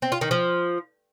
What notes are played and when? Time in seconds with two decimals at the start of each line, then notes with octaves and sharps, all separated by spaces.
0.02 C4
0.12 F4
0.21 D#3
0.31 F3